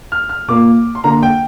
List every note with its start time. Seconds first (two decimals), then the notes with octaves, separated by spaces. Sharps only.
0.12 F6
0.29 F6
0.48 A#2 A#3 D6
0.95 C6
1.04 D3 A#3 A#5
1.23 G5